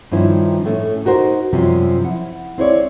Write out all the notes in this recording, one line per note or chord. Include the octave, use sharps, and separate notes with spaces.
G2 D#3 F3 C#4 E4
A2 A3 C#4
D#4 F#4 A#4 C5
F#2 C3 F3 G3 C#4
E4 F#5
C4 E4 C#5 D5